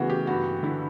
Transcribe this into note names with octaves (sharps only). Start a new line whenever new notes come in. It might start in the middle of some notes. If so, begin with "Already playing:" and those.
Already playing: C#3 E3 A3 B3 F#4
G4
G2 F#4
D3 E4